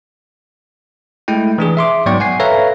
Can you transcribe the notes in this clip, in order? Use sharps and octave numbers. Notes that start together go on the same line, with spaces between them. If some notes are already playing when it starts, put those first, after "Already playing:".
G#3 A3 E4 G5
E3 D4 G#4
E5 C6 D6
G#2 F#3 B3 D5 G5 C#6
F#5 G#5 C7
A4 B4 C#5 E5 F5 A#5